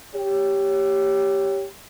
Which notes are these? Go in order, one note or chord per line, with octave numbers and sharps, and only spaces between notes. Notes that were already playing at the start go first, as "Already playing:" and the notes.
G4 C#5